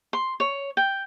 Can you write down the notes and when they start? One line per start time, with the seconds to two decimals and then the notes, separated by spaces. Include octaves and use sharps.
0.13 C6
0.40 C#5
0.77 G5